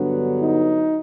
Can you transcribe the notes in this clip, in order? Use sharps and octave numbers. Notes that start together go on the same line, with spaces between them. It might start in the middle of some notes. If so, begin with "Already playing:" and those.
Already playing: G2 D3 F#3 B3
D#4